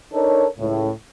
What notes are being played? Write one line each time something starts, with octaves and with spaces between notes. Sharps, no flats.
D4 D#4 A4 A#4 C#5
C#2 A2